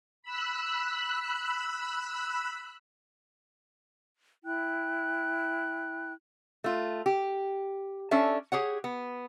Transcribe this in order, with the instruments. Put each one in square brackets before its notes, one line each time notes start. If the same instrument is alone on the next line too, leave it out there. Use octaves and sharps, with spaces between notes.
[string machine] B5 E6 F#6
[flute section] E4 G5 F#6
[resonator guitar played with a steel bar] A3 F4
G4
C#4 D4 A4 E5
G4 G#4 C#5 F#5
B3